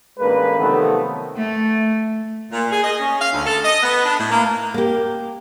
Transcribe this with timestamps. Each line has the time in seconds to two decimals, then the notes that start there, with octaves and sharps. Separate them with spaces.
0.19 A1 G#3 A#3 D4 B4
0.60 C3 D#3 F3 F#3 A3 B3
1.37 A3
2.51 A#2
2.72 G#4
2.84 D#5
2.98 C#4
3.20 F5
3.32 D2
3.44 A4
3.64 D#5
3.83 B3
4.05 D4
4.19 A2
4.31 A#3
4.74 A#3 G4